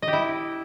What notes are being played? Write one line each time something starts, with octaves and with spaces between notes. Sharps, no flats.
D#5
G4
E4